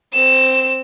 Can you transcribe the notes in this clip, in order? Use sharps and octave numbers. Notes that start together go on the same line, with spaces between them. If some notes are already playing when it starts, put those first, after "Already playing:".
C4 E7